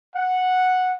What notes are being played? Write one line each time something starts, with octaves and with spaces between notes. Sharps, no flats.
F#5